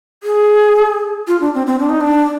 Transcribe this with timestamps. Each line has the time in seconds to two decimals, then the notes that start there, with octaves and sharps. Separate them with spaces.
0.23 G#4
1.27 F4
1.41 D4
1.54 C4
1.67 C4
1.79 D4
1.89 D#4
2.01 D4